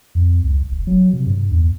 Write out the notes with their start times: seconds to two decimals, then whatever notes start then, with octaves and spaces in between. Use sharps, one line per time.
0.15 F2
0.44 C#2
0.72 F1
0.87 F#3
1.13 C3
1.26 G2
1.52 E2